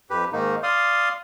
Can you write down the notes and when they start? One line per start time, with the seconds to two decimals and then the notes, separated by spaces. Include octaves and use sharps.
0.10 F2 G4 B4
0.33 G#2 D#3 A#3 D#4
0.63 D5 F5 C6 D#6